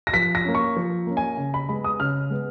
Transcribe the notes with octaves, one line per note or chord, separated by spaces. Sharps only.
A#6
F3 B6
A#6
A#3 C#4
C#6
F3
A#3 C#4
G#5
C#3
B5
G#3 B3 B5
D#6
C#3 F6
G#3 B3